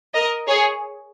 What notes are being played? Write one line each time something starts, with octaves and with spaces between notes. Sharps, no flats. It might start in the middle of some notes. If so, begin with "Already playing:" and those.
A#4 D#5
G#4 C#5